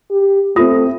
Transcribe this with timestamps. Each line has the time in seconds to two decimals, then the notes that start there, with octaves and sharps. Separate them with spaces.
0.11 G4
0.56 A3 C4 F4 D#6